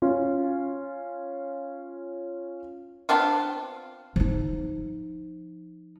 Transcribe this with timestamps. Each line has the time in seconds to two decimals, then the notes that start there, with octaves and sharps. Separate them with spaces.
0.02 C#4 F4
3.09 B3 C4 D4 F4
4.16 F3 D#4